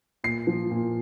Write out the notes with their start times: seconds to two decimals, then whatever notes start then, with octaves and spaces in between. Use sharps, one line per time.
0.24 A#2 C7
0.47 F3
0.71 A#2